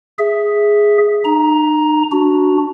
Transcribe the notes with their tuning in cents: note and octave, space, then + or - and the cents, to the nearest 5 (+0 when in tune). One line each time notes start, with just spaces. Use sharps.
G#4 +0 E5 +0
D#4 -40 A#5 +10
D4 +0 F#4 +0